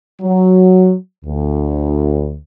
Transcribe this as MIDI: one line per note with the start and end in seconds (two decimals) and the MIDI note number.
0.21 0.95 54
1.25 2.37 38